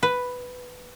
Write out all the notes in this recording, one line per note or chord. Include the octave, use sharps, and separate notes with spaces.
B4